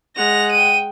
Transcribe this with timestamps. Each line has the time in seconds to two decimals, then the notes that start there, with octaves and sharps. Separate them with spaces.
0.17 G#3 F#5 A#6 F7
0.52 G5 D#7